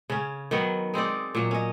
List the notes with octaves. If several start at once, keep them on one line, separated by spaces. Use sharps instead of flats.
C#3 C#4
D#3 F#3 B3
G#3 C4 D#4 D5
A#2 F#3
C#4 D#5